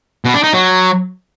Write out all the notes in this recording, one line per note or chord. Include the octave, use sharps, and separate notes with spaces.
B2
D4
D#4
F#3